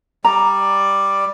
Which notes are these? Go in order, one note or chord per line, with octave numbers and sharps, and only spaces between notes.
G3 D5 A#5